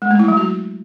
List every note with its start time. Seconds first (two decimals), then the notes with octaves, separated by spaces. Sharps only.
0.02 G#3
0.11 A3
0.19 E4
0.28 F#3
0.37 F#4